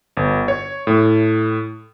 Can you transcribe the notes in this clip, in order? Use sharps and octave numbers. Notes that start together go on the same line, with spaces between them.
G1
C#5
A2